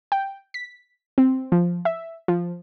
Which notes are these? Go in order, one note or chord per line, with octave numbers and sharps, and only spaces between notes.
G5
B6
C4
F3
E5
F3